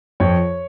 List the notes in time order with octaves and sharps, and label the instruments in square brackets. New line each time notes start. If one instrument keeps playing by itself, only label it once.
[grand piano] F2 C#5